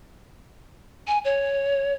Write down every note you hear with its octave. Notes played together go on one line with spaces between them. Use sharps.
G#5
C#5